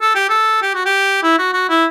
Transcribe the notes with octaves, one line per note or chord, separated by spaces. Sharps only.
A4
G4
A4
G4
F#4
G4
E4
F#4
F#4
E4